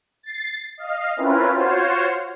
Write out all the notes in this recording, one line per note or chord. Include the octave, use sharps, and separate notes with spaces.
A6 C7
D#5 F5
C4 C#4 E4 F4 A#4 B4
F4 F#4 C5 C#5